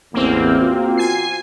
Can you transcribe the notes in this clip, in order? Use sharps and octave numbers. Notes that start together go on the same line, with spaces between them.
A1 E2 A#3 C4
F4 F#4
G#5 C7